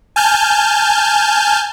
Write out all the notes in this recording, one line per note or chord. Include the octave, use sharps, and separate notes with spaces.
G#5 A5 F6 G6